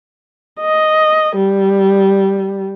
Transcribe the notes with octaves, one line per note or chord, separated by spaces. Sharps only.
D#5
G3